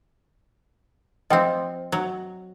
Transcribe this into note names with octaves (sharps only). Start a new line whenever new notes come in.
F3 C4 D#5 G5
F#3